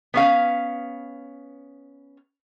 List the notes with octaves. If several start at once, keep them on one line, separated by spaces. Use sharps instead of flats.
B3 C#4 F5